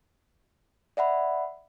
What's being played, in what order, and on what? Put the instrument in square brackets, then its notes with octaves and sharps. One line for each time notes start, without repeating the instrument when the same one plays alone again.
[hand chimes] D5 E5 F#5 B5